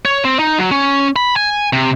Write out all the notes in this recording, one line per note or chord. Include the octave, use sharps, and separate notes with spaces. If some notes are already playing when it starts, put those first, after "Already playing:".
C#5
C4
D#4
F#3
C#4
B5
G#5
C3